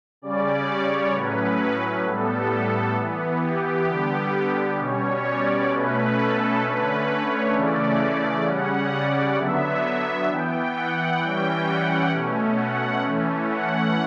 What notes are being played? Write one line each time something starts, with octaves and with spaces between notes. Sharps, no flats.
C#3 G3 C#4 D5
C#5
A2 F#3 C#4 B4
A2 G3 B3 A4
A4
E3 B3
G4
D3 G3 B3 G4
B2 G3 C#4 C#5
D5
B2 A3 C#4 B4
A4
D3 A3 C#4 B4
C#5
C#3 E3 A3 C#4 D5
D5
C#3 G3 C#4 F#5
D5
D3 F#3 B3 E5
E5
E3 B3 G5
F#5
E3 G3 C#4 G5
F#5
B2 A3 C#4
F#5
E3 A3 C#4
F#5